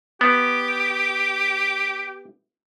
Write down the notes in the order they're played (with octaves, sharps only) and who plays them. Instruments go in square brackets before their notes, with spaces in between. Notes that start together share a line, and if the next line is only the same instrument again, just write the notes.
[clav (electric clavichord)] B3 [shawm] G4